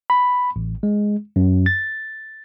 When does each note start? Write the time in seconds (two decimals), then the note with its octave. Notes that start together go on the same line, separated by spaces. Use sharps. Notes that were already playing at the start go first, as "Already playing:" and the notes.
0.10 B5
0.56 A1
0.83 G#3
1.36 F#2
1.66 A6